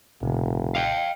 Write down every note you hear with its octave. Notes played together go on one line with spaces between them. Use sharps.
F1 B1 A#2 C#3
F5 G5